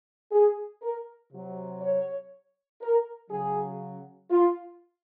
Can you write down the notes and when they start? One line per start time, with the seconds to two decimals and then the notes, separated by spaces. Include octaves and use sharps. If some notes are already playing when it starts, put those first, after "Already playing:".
0.32 G#4
0.82 A#4
1.33 C3 F#3
1.82 C#5
2.82 A#4
3.30 C#3 F#3 G#4
4.31 F4